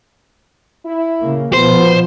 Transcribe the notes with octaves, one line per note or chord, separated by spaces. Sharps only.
E4
C#3 A#3
B2 F3 B3 C5